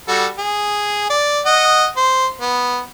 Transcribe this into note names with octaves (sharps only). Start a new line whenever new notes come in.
G3 F#4 A4
G#4
D5
D#5 F#5
C5
B3